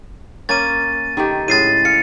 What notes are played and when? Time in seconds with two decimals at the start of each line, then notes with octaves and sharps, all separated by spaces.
0.49 A#3 C#4 A6 D#7
1.17 D#3 A3 G4
1.48 A2 C#3 G#3 A6 C7 D#7
1.85 F5 C#7